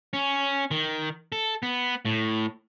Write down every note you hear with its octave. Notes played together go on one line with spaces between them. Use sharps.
C#4
D#3
A4
B3
A2